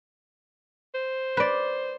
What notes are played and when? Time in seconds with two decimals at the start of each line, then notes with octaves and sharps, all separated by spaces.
0.94 C5
1.37 B4 D5